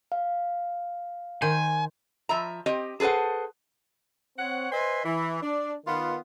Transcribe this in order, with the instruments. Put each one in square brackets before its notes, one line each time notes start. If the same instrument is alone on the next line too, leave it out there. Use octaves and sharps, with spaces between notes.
[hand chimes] F5
[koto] D#3 C5 [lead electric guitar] G#5
[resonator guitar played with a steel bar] F3 E5 A#5
C4 G4 D#5
G#4 A4 B4 C5 F#5
[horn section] C4 C#5 F#5
B4 C5 D#5 E5 G#5 C6
E3
D4
D#3 B3 F4